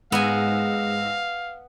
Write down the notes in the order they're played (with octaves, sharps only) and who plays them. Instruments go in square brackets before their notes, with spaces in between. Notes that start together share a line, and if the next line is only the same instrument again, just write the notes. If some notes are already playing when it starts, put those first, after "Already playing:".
[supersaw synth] G#2 E6 A#6 [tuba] G#3 [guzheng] B3 G#5 [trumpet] F5